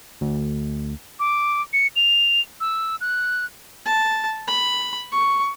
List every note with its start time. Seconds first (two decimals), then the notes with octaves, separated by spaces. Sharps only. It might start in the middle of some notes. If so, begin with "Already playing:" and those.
0.21 D2
1.20 D6
1.73 C#7
1.96 F7
2.61 E6
3.01 F#6
3.86 A5
4.47 B5
5.12 C#6